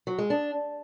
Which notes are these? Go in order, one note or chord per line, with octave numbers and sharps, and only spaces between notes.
F#3
G#3
D4